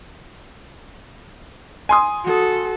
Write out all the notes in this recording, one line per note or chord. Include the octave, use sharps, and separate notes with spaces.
G#5 C6 D#6
F#4 A4